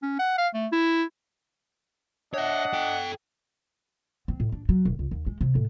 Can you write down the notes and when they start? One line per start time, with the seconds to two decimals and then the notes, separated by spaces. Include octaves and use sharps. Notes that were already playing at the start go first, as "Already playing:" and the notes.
0.03 C#4
0.19 F#5
0.38 F5
0.54 A3
0.72 E4
2.34 D4 C#5 D#5 E5 F#5
2.73 A4 G5
4.28 C4
4.40 A2
4.52 D4
4.69 F#3
4.85 E1
4.99 C#2
5.11 D#2
5.27 G#3
5.41 C3
5.55 A2